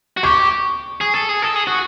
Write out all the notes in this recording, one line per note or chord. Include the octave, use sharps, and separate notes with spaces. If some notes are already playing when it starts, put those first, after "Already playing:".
F#4
G4 C#6
G#4
A4
G#4
A4
G#4
F#4